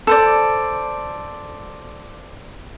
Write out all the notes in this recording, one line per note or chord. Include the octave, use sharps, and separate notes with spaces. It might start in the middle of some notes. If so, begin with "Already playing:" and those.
A4 C5 D5